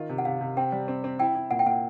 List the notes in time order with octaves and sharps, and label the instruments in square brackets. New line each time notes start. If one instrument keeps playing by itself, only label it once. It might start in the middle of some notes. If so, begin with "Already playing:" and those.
Already playing: [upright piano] D#3 F4
C3
[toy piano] F#5
[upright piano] C3 [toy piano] F5
[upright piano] C3
[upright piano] C4 [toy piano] G5
[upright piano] G3
C4
C4
[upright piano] E4 [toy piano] G5
[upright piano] E4
[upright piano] A#2 [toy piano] F#5
[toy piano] G5
[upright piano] A#2 [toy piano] F#5